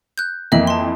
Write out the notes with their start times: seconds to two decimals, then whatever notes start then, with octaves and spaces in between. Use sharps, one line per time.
0.18 F#6 G6
0.52 F2 E3 A#3 D#5 E5 F#7
0.67 A5 C6